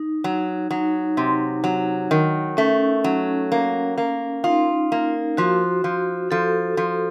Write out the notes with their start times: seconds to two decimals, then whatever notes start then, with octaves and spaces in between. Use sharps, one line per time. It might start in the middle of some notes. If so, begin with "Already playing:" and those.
Already playing: D#4
0.24 F#3
0.71 F#3 D#4
1.17 C3
1.64 F#3
2.11 D#3
2.57 A3 C#4
3.04 F#3
3.52 A#3
3.98 A#3
4.44 D#4 F4
4.92 A#3
5.37 F3 F#4
5.84 F3
6.31 F3 A4
6.77 F3